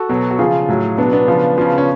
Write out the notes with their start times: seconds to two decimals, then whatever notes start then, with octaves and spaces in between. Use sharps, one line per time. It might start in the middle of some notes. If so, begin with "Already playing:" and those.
Already playing: F#4 A4
0.09 B2 F#3
0.31 F#4
0.39 C#3 F3 F4 G#4
0.68 A2 F#3
0.98 B2 F#3 B3 D4
1.13 B3 D4
1.27 C#3 F3
1.58 C#3 F3
1.78 C#4